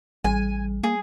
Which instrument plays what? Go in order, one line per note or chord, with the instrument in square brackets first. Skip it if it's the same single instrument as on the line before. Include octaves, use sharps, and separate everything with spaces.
[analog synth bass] A1 [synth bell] G3 [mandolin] G#5
[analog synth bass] A#3 [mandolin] G#4